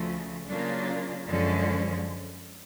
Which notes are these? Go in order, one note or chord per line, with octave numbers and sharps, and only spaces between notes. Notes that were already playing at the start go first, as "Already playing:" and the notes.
Already playing: D2 C#3 F3 A3
C#3 F#3 A#3 D4 F4
F#2 D3 F3 G#3 C#4